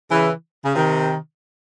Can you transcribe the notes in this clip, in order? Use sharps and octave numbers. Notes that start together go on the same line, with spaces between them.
C#3 E3
C#3
C3 D#3